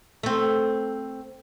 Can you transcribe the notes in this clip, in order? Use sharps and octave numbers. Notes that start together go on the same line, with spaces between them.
A3 C4